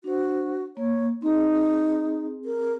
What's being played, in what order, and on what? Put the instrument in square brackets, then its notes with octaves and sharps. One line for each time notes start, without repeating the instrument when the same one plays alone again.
[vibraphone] D4 C5 [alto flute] F#4
[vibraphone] A#3 [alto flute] C#5
[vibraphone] C4 G#4 [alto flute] D#4
[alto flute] A#4